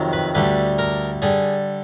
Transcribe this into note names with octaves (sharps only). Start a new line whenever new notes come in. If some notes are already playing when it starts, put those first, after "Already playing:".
Already playing: F2 C3 D#3 F#3
B4
D2 D3 G3 B4
A#4
D3 G3 G#4